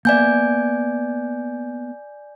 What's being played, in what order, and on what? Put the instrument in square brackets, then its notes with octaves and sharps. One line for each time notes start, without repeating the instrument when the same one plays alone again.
[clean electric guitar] A#3 B3 E5 [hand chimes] D5 G#5 G6